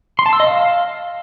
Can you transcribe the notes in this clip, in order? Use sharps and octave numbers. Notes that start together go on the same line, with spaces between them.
C6
A5
E6
D#5
F5